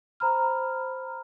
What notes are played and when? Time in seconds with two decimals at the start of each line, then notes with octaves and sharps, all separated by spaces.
0.20 C5 A#5 B5 F6